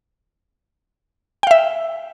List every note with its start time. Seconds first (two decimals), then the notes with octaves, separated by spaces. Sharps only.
1.43 G5
1.47 F5
1.51 E5